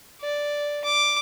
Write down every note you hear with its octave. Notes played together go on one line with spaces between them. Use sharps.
D5
D6